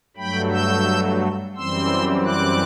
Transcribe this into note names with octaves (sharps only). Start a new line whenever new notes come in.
G2 F#3 A3 G5 B5
E6 G6
F#2 E3 G3 C4 C6 E6
D6 F#6